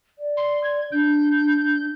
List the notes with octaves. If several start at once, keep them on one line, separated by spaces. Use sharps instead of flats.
D5
C6
G#6
D4 G6